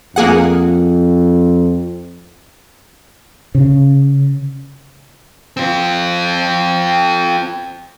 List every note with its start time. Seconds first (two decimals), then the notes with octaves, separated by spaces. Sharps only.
0.16 F2 A#3 G#4 F#5
3.55 C#3
5.57 C4 F4